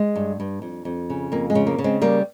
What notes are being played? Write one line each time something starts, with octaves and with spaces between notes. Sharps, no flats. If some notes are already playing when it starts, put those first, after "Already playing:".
Already playing: G#3
G2
G2
F2
F2
C#3
F2 A#3
G#3
C#3
A#3
C#3
G#3 C4
G3 A#3